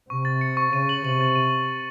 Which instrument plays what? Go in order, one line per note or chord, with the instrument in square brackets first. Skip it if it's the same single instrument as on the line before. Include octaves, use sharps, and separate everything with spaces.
[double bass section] C3 [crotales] C#6
[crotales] A6
C#7
C#6
[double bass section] C#3 [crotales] D#7
[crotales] F#7
[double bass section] C3 [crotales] F#7
[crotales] A6
D#7